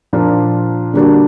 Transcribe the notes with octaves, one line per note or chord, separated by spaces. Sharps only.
A#2 F3 A#3 D4 F4
D3 G3 A#3 D4 F#4